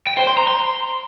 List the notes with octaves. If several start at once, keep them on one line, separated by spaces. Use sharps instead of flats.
G5
C5
C6
A#5
C6